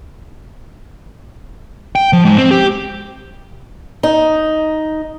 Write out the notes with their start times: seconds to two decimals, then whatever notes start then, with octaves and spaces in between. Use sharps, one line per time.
1.96 G5
2.13 F3
2.25 G#2
2.38 C4
2.51 G4
4.03 D#4